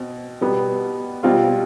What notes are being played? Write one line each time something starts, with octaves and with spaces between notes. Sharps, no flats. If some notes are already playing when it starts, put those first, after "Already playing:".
Already playing: B2 C4
B2 G3 B3
B2 G3 C4 F4